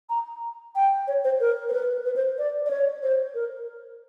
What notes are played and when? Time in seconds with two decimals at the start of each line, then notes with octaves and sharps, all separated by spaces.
0.10 A#5
0.76 G5
1.08 C#5
1.24 C5
1.40 A#4
1.69 C5
1.73 B4
2.05 B4
2.16 C5
2.38 D5
2.66 D5
2.71 C#5
3.03 C5
3.35 A#4